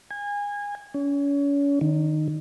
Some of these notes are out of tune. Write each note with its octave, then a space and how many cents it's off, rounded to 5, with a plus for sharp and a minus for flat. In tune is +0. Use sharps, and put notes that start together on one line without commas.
G#5 -25
C#4 +35
D#3 -15